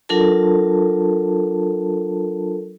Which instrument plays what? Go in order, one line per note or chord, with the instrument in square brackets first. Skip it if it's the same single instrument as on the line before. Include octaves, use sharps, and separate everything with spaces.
[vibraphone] F#3 D4 F4 A4 A#4 A5